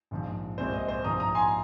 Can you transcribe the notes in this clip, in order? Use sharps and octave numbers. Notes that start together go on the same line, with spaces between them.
A#1 G#2 F3
C2 A#2 G#3 C4 C5
D#5
C5
A#1 G#2 F3 A#5 D#6
A#5 D#6
G#5 C6